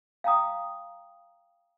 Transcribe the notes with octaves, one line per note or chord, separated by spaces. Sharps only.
F5 G5 A#5 D#6